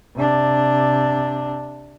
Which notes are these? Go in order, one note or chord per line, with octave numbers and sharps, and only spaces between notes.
C3 D4